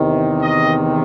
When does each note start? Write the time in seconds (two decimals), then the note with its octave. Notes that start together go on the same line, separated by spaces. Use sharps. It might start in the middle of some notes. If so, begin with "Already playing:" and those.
Already playing: E2 C3 D#3
0.43 D#5